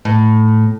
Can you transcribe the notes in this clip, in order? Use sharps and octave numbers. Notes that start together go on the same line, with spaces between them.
A2